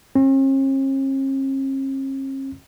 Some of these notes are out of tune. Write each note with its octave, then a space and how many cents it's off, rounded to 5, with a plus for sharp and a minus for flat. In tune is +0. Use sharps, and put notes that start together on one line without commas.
C#4 -45